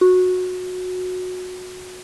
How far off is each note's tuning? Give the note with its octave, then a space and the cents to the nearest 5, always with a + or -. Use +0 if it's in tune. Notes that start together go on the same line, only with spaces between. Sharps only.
F#4 -15